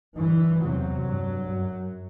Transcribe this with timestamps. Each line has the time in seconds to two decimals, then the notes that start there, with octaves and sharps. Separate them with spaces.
0.18 G2 E3
0.62 E2 C3 F#3
1.05 G2
1.49 F#2